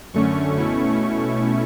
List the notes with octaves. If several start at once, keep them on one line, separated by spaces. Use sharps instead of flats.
F#2 D3 A3 C#4 C#6
B2 A3 C#4 E4 C#6